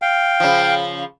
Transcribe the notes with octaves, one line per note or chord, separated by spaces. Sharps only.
F5 G5
C#3 F3